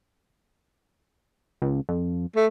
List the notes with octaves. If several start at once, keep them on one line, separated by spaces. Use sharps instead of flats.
C#2
F2
A3